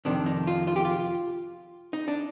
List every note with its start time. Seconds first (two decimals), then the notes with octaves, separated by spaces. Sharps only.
0.05 F2 C3 D#3 D4
0.26 D#4
0.47 F4
0.67 F4
0.76 G4
0.85 F4
1.93 D#4
2.08 D4